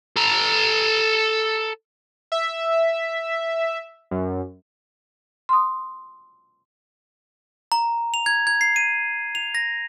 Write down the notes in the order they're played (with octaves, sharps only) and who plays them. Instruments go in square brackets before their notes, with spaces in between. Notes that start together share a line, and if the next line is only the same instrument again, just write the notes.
[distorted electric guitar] A4 A#5
[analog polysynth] E5
F#2
[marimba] C6 D#6
[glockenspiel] A#5
F7
G#6
G#6
C7
D#7
F7
A#6